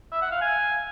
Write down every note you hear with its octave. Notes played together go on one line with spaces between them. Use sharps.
E5
F#5
F5
G#5